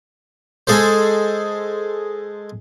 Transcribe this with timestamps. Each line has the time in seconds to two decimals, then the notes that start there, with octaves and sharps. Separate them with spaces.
0.67 G#3 G#4 A4 C5